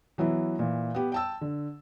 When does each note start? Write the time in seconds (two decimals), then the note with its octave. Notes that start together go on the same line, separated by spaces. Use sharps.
0.18 E3 F#3 B3 E4
0.59 A#2 E3
0.94 B3 G4
1.12 G5 A5 E6
1.41 D3